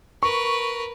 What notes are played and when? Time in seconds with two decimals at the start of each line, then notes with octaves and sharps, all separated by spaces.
0.23 A#4 B4 C#6